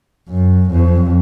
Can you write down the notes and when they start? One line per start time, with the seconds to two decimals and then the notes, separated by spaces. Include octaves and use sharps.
0.29 F#2
0.71 F2